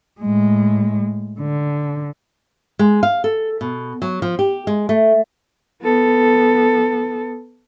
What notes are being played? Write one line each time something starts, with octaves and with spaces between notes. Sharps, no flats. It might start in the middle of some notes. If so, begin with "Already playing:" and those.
A2 G#3
D3
G#3
F5
A4
B2
F#3
F3
G4
G#3
A3
B3 A4